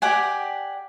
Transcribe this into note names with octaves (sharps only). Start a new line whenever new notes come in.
G4 D5 F#5 G#5